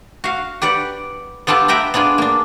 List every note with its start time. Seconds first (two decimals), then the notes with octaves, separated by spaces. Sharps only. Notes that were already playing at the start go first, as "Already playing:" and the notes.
0.24 F#4 F5
0.62 G4 B4 D5 F#5
1.47 B3 F4 G4 A4 A5
1.68 B4 E5 G5 A#5 B5
1.94 B3 D4 F4 G#4
2.18 A#3 D4